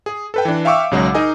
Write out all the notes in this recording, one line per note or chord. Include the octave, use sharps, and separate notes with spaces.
G#4
A4 B4 G5
E3 D4
E5 F5 G5 C#6 D6 E6
B1 C#3 F#3 G#3 F#5
D#4 G#4 A#4 D#5 G#5